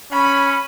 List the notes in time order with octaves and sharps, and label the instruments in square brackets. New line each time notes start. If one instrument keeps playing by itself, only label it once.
[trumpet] C#4 [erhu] B5